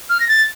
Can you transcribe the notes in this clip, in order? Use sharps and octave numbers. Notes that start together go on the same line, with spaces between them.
F6
A#6
A6